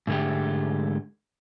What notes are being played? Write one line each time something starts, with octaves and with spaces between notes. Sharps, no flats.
G#2 D3 G#3 A3 G4